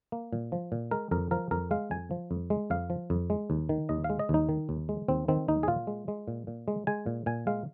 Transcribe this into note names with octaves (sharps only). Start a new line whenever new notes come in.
A#3
A#2
F3
A#2
G#3 A#4
F2 A#4
F3 A#4
F2 A#4
G#3 F5
F2 G#5
F3
F2
G#3
F2 F5
F3
F2
G#3
D#2
D#3
D#2 D#5
F5
G#3
D#5
D#2 D#4
D#3
D#2
G#3
D#2 C4
D#3 C4
D#2 D#4
G#4
A#2 F4
G#3
G#3
A#2
A#2
G#3
G#3 G#5
A#2
A#2 G#5
G#3 F5